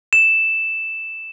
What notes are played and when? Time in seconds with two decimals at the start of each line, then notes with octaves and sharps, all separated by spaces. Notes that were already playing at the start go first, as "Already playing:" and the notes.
0.13 E7